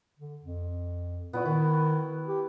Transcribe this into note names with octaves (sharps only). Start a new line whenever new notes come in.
D3
F2
A#2 B3 E4 F#4
D#3 E4
G4